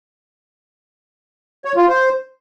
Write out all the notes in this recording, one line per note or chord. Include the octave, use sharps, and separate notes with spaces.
C#5
F4
C5